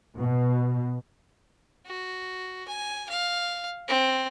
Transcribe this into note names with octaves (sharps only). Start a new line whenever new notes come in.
B2
F#4
G#5
F5
C4